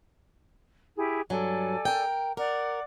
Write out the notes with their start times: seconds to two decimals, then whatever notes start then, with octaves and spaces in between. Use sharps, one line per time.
0.96 E4 G4 G#4
1.30 G2 F#3 A4 D5 G#5
1.85 A#4 G5
2.37 A#4 D5 F#5 D6